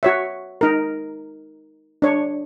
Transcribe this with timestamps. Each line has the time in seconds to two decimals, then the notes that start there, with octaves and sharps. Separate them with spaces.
0.03 F#4 C#5 E5
0.61 D#4 A#4
2.02 D4 C#5